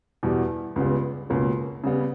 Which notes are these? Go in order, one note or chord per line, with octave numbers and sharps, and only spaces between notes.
E2 B2 G3
C#2 C#3 G3 B3
C#2 B2 A#3 C#4
C#3 G3 B3